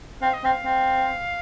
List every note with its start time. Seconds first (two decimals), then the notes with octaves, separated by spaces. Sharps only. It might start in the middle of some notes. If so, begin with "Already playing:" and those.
0.22 C4 F5
0.34 D#5
0.44 C4 F5
0.64 C4